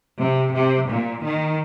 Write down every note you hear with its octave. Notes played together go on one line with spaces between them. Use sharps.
C3
C3
A#2
D#3